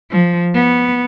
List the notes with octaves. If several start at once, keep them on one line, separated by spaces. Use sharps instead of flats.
F3
B3